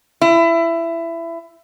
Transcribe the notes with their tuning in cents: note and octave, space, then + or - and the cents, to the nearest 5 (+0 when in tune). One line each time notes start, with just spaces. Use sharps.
E4 +20